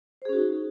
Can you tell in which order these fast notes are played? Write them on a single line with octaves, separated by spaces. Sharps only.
C5 G#4 C#4 F#4 D#4